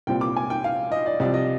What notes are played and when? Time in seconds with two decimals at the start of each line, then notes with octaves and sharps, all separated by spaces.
0.07 C2 A#2 G3 C4 G5
0.21 D6
0.36 G#5
0.50 G5
0.64 F5
0.92 D#5
1.06 D5
1.20 C2 C3 F3 D5
1.34 D#5